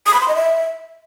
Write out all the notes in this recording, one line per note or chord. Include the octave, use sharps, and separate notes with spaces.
D#6
B5
C6
D#5
E5